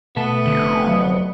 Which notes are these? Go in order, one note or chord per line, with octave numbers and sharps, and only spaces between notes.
B2 A3 B3 E5 A5
F1 D3
F#3